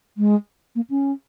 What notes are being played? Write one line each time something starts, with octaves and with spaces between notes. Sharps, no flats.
G#3
A#3
C#4